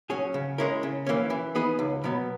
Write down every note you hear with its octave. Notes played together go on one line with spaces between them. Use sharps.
F#3 C#4 G#4
C#3
G#3 C#4 E4 A#4
C#3
E3 A#3 C#4
E3
B3 D#4 G#4 B4
C#2
B2 F#3 B3